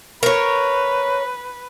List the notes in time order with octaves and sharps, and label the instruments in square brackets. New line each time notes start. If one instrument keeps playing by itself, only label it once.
[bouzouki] A#4 C#5 [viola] B4